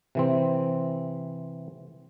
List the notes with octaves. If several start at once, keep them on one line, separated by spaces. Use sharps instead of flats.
C3 E3 C4